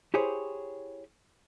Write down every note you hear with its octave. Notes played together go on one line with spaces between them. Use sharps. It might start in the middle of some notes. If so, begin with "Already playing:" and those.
E4 G4 G#4 C5 C#5